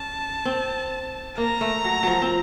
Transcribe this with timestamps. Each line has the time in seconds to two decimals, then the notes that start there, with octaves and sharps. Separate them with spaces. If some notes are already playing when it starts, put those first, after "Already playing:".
Already playing: C#4 A5
0.45 C4
1.38 A#3 A#5
1.61 A3
1.84 F#3
2.03 F3 F#3
2.22 C4